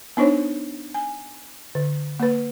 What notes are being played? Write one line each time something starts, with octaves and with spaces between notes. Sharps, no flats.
B3 D4 D#4 C5 C#5
G#5
D3
A#3 B4